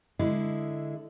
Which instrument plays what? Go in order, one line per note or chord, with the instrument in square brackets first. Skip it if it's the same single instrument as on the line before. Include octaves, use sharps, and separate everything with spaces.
[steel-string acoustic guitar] D3 G#3 E4